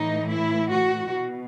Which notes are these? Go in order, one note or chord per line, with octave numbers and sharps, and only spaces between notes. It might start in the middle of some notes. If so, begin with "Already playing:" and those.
Already playing: A2 E3 D#4
E4
F#4
B2